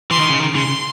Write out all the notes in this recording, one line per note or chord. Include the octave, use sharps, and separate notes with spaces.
E3 C6
D#3
C#3
D#3
C#3 C6